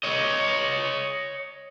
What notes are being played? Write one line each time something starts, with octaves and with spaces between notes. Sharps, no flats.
C#5 D#5